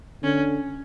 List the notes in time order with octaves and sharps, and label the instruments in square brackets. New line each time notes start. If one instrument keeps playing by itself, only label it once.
[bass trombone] D3 [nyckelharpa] C#4